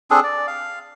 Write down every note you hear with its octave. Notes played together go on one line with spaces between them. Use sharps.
C4 D4 G#4 A4
D5
F5